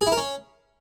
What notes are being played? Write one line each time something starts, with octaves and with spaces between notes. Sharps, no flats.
G#4
E4
A#4
C#4